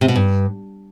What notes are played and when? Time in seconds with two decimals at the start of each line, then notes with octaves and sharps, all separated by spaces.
0.01 C3
0.08 B2
0.16 G2